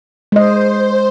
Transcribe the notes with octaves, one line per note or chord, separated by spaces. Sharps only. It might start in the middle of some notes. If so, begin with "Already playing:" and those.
G#3 C5 D#5